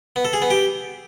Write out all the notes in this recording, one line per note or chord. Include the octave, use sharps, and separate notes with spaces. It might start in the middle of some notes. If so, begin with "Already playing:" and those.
B3
A4
G#4
B3
G4